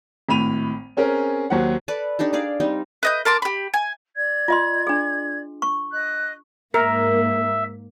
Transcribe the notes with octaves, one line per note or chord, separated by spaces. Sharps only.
G#1 A2 B5 D#7 F7
C4 C#4 G#4 A#4
D#2 F#3 C5 F#5
A4 B4 D5
D4 D#4 G4 A4
D4 G#4 D5 F5
G3 C4 D#4
B4 D#5 G6
A#4 A5 C6 D6
G4 B5
G#5
D5 G#6
F4 D#5 C6
D4 G#4
C#6
D#5 F#6
G#2 A#3 A#4 E5